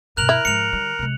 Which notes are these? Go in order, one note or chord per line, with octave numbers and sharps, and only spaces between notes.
G2 B2 A#4 F#6 F7 F#7
E4
G#2 F3 C#7 F7
D3 G3
C3 G#3